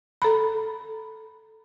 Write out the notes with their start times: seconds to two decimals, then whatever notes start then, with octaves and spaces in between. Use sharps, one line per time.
0.22 A4 A#5 B5